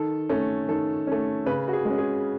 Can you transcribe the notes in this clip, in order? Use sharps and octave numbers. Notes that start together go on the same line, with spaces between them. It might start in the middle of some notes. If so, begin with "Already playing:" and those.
Already playing: D#3 A4
A3 C#4
D#3 A4
A3 C#4
C#3 B4
F#4
G#4
G#3
C#4
G#4